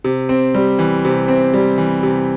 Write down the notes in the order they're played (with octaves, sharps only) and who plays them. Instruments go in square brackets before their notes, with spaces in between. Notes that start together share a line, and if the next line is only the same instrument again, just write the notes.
[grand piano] C3
C4
G3
E3
C3
C4
G3
E3
C3